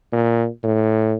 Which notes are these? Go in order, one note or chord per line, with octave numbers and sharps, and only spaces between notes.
A#2
A2